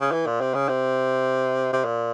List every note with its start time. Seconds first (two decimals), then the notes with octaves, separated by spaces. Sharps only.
0.01 C#3
0.12 E3
0.26 A#2
0.41 C3
0.55 C#3
0.69 C3
1.73 C3
1.85 A#2